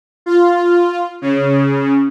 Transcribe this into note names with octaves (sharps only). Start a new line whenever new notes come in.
F4
C#3